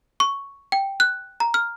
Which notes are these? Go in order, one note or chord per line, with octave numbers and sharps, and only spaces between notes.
C#6
G5
F#6
A#5
F6